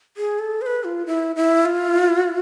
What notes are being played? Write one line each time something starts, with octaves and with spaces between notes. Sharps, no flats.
G#4
A4
C5
B4
F4
E4
E4
F4